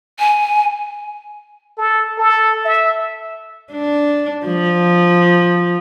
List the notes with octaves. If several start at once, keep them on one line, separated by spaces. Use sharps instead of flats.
G#5
A4
A4
E5
D4
F3